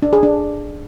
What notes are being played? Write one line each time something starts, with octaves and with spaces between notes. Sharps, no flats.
D4
G#4
D4